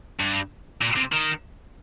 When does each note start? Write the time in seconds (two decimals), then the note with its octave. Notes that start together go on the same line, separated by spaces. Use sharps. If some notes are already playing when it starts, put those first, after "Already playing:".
0.20 G2
0.81 A#2
0.96 C3
1.12 D#3